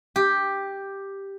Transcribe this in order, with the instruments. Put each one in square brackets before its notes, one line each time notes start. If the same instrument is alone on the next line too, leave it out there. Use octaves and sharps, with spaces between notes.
[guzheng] G4